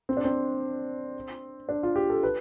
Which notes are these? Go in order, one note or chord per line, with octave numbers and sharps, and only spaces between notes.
C4
D4
C4
D4
F4
G4
A4
B4